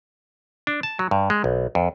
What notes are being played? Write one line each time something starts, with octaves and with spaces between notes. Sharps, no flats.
D4
A5
F#3
G2
G#3
B1
F2